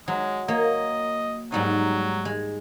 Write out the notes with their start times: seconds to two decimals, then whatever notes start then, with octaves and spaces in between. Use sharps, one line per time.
0.08 F#3 G#3
0.48 A#3 C#5 D#5
1.52 G#2 F#3 G3 D#4
2.25 G#3